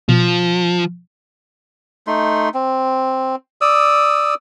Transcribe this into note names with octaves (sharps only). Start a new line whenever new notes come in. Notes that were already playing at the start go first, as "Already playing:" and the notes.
B2 F3
A3 D#4 C6
C4
D5 D#6 E6